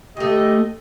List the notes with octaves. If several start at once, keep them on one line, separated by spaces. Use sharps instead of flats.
D2 A3 G4 D#5